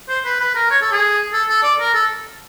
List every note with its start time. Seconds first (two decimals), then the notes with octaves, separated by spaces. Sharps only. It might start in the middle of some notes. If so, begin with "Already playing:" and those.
0.09 C5
0.25 B4
0.40 B4
0.55 A#4
0.71 C#5
0.82 A4
0.92 G#4
1.33 A4
1.49 A4
1.63 D5
1.80 A#4
1.94 A4